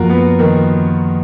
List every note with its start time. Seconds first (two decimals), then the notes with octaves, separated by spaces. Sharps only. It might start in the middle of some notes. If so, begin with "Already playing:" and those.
Already playing: F#2 F3 A#3 F4 F#4 A#4
0.10 B3
0.39 D#3